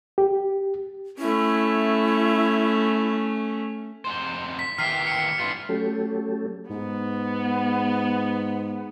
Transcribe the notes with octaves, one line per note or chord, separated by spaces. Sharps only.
G4
A3 C#4 E4
F2 D#4 C5
B6
D#3 E3 G4 F6 B6 C7
C#7
G2 E3 F4
F#3 A3 C#4 G4 A4
G#2 B3